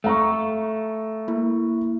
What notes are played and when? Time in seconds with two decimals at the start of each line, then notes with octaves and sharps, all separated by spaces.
0.04 A3 F5 A#5 C#6
1.28 A#3 E4